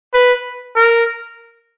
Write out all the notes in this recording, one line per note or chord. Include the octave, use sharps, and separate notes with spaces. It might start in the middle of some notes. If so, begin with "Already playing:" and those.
B4
A#4